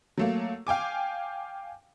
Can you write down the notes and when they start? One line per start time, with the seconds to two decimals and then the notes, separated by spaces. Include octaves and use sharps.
0.18 F#3 A3 A#3
0.67 F5 G5 G#5 D6